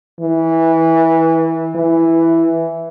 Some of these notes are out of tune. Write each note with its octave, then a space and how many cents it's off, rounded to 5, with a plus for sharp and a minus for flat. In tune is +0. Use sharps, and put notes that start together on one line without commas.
E3 -15
E3 +5